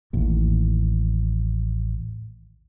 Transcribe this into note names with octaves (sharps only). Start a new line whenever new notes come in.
A1 D#2